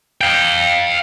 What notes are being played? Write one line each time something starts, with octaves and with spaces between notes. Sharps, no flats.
F5 G5